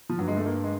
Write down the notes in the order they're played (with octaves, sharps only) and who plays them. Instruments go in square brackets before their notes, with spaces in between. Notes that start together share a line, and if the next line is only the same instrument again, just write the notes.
[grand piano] F3
[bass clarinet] G2 [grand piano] F#3
[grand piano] G#3
A3
A#3
G#3